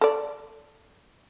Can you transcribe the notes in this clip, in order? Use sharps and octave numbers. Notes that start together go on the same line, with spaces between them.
A4 D5